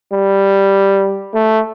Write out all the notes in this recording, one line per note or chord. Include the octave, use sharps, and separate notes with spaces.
G3
A3